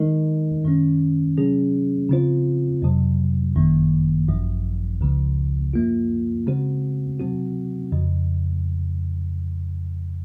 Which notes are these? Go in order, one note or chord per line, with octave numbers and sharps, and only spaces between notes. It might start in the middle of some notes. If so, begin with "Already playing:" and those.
Already playing: D#3 G#3 D#4 A#4 D#5
F#2 D#3 G#3 C#4
C3 F#3 C#4 G#4
C#3 F3 C4 F4 C5
F2 C3 F#3
G#1 F#2 D#3 A#3
G#1 F#2 F3
C#2 C#3 F3 G#3
F#2 F3 A#3 F4
C#3 G#3 C4 F#4 C5
C3 F#3 C4 F#4
F2 C#3 F3